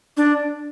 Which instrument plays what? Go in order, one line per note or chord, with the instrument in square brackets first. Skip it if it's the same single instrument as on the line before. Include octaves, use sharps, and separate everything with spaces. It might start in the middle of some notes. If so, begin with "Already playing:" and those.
[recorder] D4